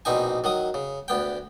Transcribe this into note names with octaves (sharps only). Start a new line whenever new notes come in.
A#1 B2 C4 D#4 G#5
D#3 F#3 D#6
C#3
D2 B3 G5